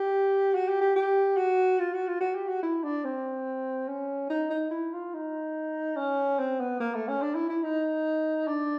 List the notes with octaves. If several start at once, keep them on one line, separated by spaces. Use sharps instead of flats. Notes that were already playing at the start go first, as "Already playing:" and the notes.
Already playing: G4
F#4
G4
G4
G4
F#4
F4
F#4
F4
F#4
G4
F#4
E4
D4
C4
C#4
D#4
D#4
E4
F4
D#4
C#4
C4
B3
A#3
A3
C#4
D4
E4
E4
D#4
D4